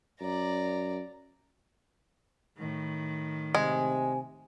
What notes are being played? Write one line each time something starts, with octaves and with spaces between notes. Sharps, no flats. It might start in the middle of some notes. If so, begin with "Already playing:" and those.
F#2 D5 A#5
A2 D#3
C3 G#3 G#5